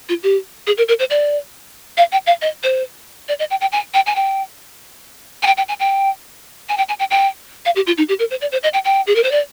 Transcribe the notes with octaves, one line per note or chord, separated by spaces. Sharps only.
F4
G4
G#4
A#4
A#4
C5
D5
F5
G5
F5
D#5
C5
D5
D#5
G5
G5
G#5
G5
G#5
G5
G#5
G5
G5
G#5
G5
G#5
G5
G#5
G5
G5
F5
G4
F4
D#4
G4
A#4
C5
D5
C5
D#5
G5
G5
G#4
A#4
C5
D5